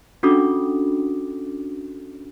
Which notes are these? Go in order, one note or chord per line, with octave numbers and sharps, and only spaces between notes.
C#4 D4 F#4 A4 D6 D#6